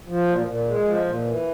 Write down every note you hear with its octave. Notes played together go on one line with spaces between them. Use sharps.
F3
A#2
A#2
G#3
F3
A#2
E3